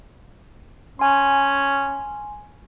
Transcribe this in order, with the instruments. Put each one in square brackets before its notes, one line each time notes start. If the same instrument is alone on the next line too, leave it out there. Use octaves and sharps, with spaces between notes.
[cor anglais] C#4 [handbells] G#5 C6